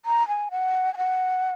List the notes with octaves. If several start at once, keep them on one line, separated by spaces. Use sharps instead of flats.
A#5
G#5
F#5
G#5
F#5